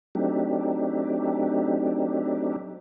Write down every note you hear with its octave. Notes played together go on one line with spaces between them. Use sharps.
F#3 A3 C4 D4 D#4 G4